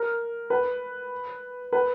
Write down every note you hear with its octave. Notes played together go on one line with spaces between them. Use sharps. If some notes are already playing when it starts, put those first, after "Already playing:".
Already playing: A#4
B4
B4